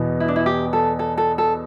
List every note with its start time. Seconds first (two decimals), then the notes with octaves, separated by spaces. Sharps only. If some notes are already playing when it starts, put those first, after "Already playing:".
Already playing: E2 B2 B3
0.20 E4
0.28 D4
0.36 E4
0.46 G4
0.73 A4
0.99 A4
1.18 A4
1.38 A4